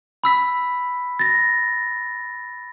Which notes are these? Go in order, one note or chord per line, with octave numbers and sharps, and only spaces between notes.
B5 E6 B6
A6 A#6